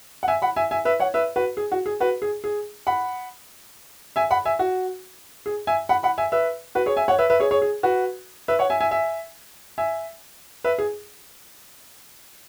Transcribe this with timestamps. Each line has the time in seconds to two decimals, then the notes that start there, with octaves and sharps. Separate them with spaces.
0.23 F#5
0.28 E5 G#5
0.42 F#5 B5
0.56 E5 G#5
0.71 E5 G#5
0.85 B4 E5
1.00 C#5 F#5
1.14 B4 E5
1.36 F#4 B4
1.57 G#4
1.72 F#4
1.86 G#4
2.00 F#4 B4
2.22 G#4
2.44 G#4
2.87 F#5 B5
4.16 E5 G#5
4.31 F#5 B5
4.45 E5 G#5
4.59 F#4
5.46 G#4
5.67 E5 G#5
5.89 F#5 B5
6.03 F#5 B5
6.18 E5 G#5
6.32 B4 E5
6.75 F#4 B4
6.86 G#4 C#5
6.97 E5 G#5
7.08 C#5 F#5
7.19 B4 E5
7.30 B4 E5
7.40 G#4 C#5
7.51 G#4 C#5
7.62 G#4
7.83 F#4 B4
8.48 B4 E5
8.59 C#5 F#5
8.70 E5 G#5
8.80 E5 G#5
8.91 E5 G#5
9.78 E5 G#5
10.64 B4 E5
10.79 G#4